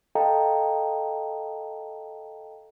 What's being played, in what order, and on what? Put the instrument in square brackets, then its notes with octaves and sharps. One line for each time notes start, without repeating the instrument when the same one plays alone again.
[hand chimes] A4 D#5 F5 G5 A5 A#5